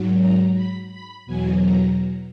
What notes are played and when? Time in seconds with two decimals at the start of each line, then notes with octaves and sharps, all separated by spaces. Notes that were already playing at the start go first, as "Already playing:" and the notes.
Already playing: G#2 F#3
0.19 A#5
0.55 B5
0.91 B5
1.26 E2 B2 F#3 G#5
1.62 A#5